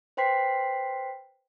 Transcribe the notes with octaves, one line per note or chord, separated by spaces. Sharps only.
B4 C5 G5 C6 B6 C7